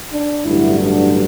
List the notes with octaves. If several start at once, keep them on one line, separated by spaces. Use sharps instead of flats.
D4
A1 G2 D3 F#3 E4
D4